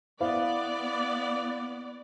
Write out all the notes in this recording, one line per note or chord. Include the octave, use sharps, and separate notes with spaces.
B3 E4 C5 D5 F5